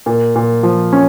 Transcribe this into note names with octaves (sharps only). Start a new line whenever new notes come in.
A#2
A#2
F3
C#4